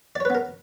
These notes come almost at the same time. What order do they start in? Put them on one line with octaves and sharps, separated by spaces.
D5 C#5 B4 B3 A#4